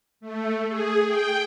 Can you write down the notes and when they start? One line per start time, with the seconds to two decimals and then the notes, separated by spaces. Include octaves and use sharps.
0.20 A3
0.68 G#4
1.06 G5